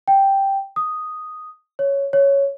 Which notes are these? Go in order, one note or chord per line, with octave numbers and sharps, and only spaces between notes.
G5
D#6
C#5
C#5